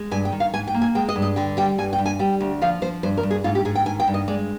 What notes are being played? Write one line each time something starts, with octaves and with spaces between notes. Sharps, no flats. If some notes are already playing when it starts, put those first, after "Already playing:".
Already playing: G#3
G2 G#5
G5
D#3
F5
G#2 G#5
G5
A#3
G#5
G#3 G5
D#5
G2
D#5
D3 G5
G3 G5
G2 G#5
G5
G2
G#5
G3 G5
D2
F3 F5
F3 C5
G2 C5
A#4
G2
G#4
G#2 F4
G4
G#2 G#4
G5
D#3 G#5
G5
G2
D#5
G#3 D5